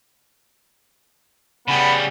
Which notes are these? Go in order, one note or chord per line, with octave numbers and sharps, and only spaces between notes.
C#3 G3 B3 B5